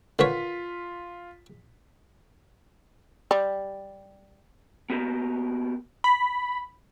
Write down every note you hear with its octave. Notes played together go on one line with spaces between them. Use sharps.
D3 F4 A#4 B4 C#5 B6
G3
A#3 B3 F#4 G4 A#4
B5